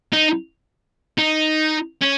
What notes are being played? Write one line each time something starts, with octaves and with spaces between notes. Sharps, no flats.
D#4
D#4
C#4